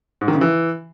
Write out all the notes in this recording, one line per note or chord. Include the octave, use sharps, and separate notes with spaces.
G#2
D#3
C#3
E3